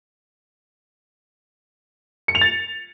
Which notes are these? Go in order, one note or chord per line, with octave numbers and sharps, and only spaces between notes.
C#7
F7
A6